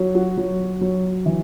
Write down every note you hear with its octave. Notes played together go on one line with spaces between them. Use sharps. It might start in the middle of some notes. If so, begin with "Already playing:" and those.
Already playing: F#3
F#4
F#3
F#3
E3